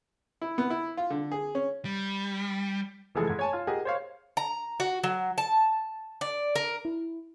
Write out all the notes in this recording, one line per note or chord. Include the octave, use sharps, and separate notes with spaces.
E4
B3
E4
F4
D3
G#4
C#4
G3
F1 E3 F3 G#3 G#4 A4
G#2 G#6
C#5 G#5 A5
F4
G4 G#4 A#4 D#5 F#5
C5 C#5 F5
A#5
F#4
F#3
A5
D5
A#4
E4